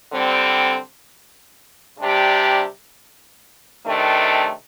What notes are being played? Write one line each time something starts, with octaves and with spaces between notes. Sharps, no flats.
D3 G3 C4
C3 G3 D4 G4
C3 D#3 A3 D4